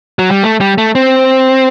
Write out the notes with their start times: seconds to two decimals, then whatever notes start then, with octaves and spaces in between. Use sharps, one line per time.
0.19 F#3
0.31 G3
0.43 A3
0.61 G3
0.78 A3
0.95 C4